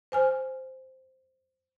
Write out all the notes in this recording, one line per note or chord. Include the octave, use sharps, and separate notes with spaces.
C5 G#5 F6